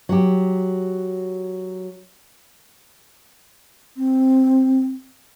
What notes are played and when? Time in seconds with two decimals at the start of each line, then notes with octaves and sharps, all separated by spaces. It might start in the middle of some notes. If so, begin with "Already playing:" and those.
0.09 F#3 G4
3.97 C4